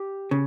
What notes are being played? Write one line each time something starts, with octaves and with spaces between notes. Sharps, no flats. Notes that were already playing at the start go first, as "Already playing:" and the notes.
Already playing: G4
C#3